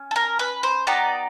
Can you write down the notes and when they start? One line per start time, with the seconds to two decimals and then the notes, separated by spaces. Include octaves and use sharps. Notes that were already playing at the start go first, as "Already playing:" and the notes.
Already playing: C#4
0.11 A4
0.16 A#4
0.39 B4
0.63 C5
0.87 B3 D#4 G4 D5